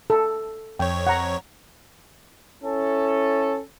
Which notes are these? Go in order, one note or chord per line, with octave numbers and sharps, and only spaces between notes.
A4
F2 C#5 G5
F#5 A#5
C#4 E4 A4